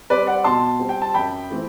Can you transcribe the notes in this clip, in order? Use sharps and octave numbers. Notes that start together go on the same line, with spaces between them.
G3 C4 B4 D5
D5 F#5
B2 A5 C6
G3 C4
G5
A5
F#2 G5 B5
E3 A3 C4